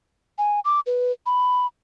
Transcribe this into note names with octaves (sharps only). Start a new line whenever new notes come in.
G#5
D6
B4
B5